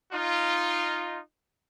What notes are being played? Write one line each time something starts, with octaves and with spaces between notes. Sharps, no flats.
D#4 F4